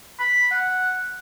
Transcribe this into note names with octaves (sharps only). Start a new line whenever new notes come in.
B5
F#5